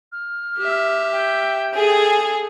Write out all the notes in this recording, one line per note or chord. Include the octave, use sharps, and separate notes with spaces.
F6
G4 E5
G5
G#4 A4